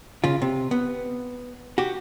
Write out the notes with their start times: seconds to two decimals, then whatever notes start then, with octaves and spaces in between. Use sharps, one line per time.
0.24 C#3 F4
0.42 C3
0.71 B3
1.78 F#4 G4